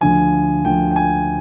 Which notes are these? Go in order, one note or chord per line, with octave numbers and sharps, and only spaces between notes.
D2 D3 F3 G#5
D2 D3 F3 G5
G5
G#5